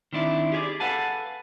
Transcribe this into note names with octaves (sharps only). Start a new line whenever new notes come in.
D#3 C4 D4 E4
G4 G#4 C#5 D5
A4 B4 F5 F#5 G#5 A5